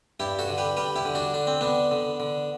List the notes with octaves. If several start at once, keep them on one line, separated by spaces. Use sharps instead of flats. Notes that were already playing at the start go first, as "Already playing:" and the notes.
G2 E4 G4
F#4 A4
D3
G4 B4
G3 G4 B4
E4 G4
D3
D4 F#4
D3 D4
C4
D3 B3 D4
D3
D3